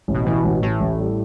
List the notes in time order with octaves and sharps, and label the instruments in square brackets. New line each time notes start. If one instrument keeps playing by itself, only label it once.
[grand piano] A1
[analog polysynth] B2
[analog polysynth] B2 [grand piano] E3
[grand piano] A1
[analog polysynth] A2 [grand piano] E3
[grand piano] A1
G3